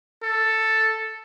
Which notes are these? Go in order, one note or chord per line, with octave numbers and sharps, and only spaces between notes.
A4